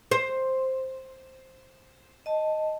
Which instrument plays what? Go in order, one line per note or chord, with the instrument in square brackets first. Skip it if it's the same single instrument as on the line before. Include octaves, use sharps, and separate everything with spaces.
[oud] C5
[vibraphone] D#5 A5